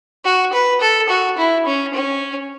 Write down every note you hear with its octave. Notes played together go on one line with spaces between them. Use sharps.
F#4
B4
A4
F#4
E4
C#4
C#4